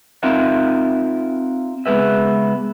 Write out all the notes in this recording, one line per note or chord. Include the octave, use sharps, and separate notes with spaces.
C4 D#4 F4 A#4 E5 F#5
C#2 G#3 B3 B4 E5